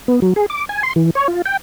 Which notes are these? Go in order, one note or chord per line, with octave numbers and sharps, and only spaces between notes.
B3
F#3
G#4
D6
G#5
C6
E3
C#5
F4
G5